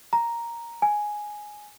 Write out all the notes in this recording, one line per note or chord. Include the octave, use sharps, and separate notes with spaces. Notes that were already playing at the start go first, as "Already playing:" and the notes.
A#5
G#5